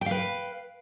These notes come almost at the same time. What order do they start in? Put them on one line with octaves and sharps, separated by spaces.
G5 F5 B4